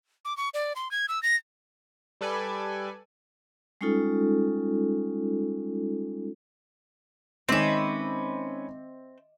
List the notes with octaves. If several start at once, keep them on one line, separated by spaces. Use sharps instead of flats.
D6
C#6
D5
C6
G#6
E6
A#6
G3 A4 B4 D5 G#5
G3 G#3 C#4 D#4 F4 A4
D#3 G#3 C4 C#4 B4 D#5 E5 D6